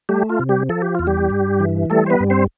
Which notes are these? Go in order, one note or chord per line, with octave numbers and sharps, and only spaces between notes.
G3 A3 G4
F4
C3
G3 G4
F3 A4
G4
E2 F4
G3 G4
G2
E3
G3 A3 A4
C5
B3 B4
G2
C4 C5